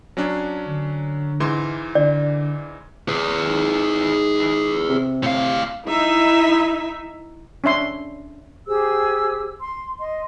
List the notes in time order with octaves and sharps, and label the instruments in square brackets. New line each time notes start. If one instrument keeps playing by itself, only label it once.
[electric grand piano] F#3 C#4 D4
[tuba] D3
[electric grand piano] G#2 E3 C6
[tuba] D3 [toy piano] D5
[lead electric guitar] G#4 B4
[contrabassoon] G#2
C3
[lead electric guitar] A2 F5
[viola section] D#4 E4 E5
[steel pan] C#4 D4 E5 C6
[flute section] G4 G#4 C5 E6
C6
D#5 C6